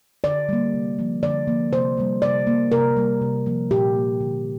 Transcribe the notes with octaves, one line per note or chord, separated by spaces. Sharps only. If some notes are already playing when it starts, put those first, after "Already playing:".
D3 D5
G3 A#3
C3
F3 A#3
D3 D5
F3 A#3
C3 C5
G3 A#3
C3 D5
A#3
C3 A#4
G3 A#3
C3
F3 A#3
A#2 G4
A#3
D3